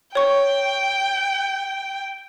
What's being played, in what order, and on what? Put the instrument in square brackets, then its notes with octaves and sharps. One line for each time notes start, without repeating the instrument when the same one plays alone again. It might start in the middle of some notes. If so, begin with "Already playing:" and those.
[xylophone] C#5 C#6 [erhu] G5